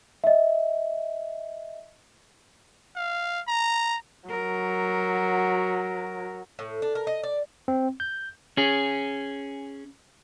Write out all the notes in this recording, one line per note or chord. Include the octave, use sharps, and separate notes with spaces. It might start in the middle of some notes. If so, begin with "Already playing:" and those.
D#5 E5
F5
A#5
F#3 A#4
A2
D4
A#4
D#5
D5
C4
G6
C#4 G#4